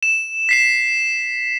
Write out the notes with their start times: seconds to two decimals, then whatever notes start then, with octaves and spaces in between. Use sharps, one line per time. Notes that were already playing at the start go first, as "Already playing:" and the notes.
0.03 E7
0.49 B6 C7 E7